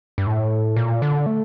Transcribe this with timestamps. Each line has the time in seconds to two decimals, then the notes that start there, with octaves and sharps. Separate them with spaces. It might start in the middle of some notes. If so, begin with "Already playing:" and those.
0.18 G2
0.27 A2
0.76 A#2
1.02 D3
1.26 A3